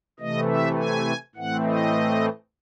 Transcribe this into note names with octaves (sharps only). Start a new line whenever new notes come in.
C3 E3 A3 D#5
E5
G#5
A2 E3 A3 C4 F#5
D#5